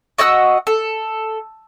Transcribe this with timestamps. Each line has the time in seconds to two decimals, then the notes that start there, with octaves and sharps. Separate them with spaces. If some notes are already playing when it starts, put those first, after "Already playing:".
0.18 F#4 D#5 F#5 E6
0.67 A4